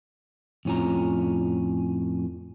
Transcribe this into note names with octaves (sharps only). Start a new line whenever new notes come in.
F2 A2 C#4 F4 A#5